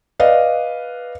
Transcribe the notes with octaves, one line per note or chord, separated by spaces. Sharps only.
B4 D5 D#5 F5